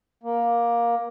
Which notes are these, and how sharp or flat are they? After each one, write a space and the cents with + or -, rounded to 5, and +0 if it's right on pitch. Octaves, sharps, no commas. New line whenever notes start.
A#3 +15